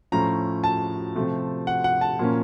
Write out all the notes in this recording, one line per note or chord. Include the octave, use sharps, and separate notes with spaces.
A2 F3 A3 C#4 A#5
A5
C3 F3 A3 C4
F#5
F#5
A5
A#2 F3 A#3 C#4